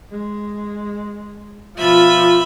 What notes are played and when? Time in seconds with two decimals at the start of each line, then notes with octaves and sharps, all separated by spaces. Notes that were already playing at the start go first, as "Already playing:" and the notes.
0.11 G#3
1.78 B2 F3 F4 E5 B5